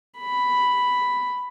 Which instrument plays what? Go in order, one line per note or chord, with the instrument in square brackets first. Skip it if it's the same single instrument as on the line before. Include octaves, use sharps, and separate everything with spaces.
[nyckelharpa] B5